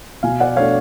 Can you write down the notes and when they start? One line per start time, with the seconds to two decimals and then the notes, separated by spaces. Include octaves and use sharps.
0.23 B2 F5 G#5
0.40 D5 F#5
0.56 A3 D4 C#5 F5